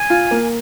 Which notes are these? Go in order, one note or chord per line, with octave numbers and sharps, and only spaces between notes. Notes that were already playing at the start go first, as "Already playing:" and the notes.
Already playing: G#5
F4
A#3